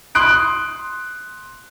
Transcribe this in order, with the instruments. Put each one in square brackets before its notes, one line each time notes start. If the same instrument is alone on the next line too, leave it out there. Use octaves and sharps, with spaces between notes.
[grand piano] C6 D#6 F#6 D7